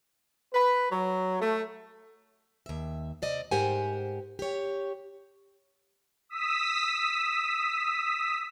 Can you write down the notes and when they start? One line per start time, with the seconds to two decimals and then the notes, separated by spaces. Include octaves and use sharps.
0.53 B4
0.91 F#3
1.41 A3
2.66 D#2 E5
3.22 C3 D5 D#5
3.51 G#2 G4 A#4 C5 F#5 G#5
4.39 G4 C#5
6.29 D#6 E6 B6